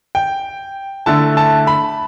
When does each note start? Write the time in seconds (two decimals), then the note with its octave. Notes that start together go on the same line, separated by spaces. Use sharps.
0.15 G5
1.06 D3 A3 E4 A5
1.37 A5
1.67 B5